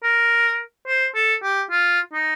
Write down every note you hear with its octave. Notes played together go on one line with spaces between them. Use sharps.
A#4
C5
A4
G4
F4
D#4